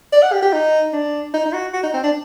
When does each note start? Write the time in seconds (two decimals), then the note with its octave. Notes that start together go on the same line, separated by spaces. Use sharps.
0.13 D5
0.23 F#5
0.33 G4
0.43 G4
0.53 D#4
0.93 D4
1.34 D#4
1.45 D#4
1.53 F#4
1.74 F#4
1.84 D#4
1.94 C4
2.04 D4